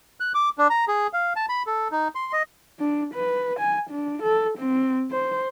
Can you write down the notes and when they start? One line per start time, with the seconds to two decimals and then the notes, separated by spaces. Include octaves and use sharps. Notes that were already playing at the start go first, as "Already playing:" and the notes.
0.20 F#6
0.35 D6
0.58 D4
0.70 A#5
0.88 G#4
1.13 F5
1.36 A5
1.49 B5
1.67 A4
1.92 D#4
2.15 C6
2.33 D#5
2.79 D4
3.14 B4
3.60 G#5
3.90 D4
4.23 A4
4.58 C4
5.11 C5